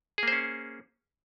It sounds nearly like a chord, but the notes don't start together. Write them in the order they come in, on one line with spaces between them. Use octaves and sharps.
G#4 A#3 C5 C#4